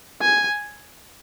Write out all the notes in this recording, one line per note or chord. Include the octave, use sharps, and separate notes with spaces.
G#5